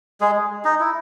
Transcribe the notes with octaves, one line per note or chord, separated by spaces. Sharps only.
G#3 G#4
D#4
E4